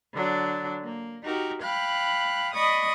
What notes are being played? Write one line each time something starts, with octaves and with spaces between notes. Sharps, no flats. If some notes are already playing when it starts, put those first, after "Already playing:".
D3 F#3 D4
A#3
D#4 F#4 G4 A#4
F5 G5 B5 F#6
D5 D#5 B5 C#6 D#6